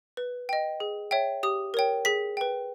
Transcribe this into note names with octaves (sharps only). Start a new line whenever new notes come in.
B4
D#5 G5
G#4
C#5 E5 G5
G4 D#6
A#4 C#5 G5
G#4 B6
B4 G5